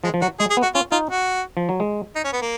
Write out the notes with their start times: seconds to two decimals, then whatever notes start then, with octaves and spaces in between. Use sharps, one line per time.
0.04 F3 G#3
0.14 F3
0.22 F#3 F#4
0.40 G#3 G#4
0.50 G#4
0.57 B3
0.63 F#4
0.75 C#4 F4
0.92 D#4 F4
1.10 F#4
1.57 F3
1.69 F#3
1.80 G#3
2.15 D#4
2.24 C#4
2.33 B3
2.42 A#3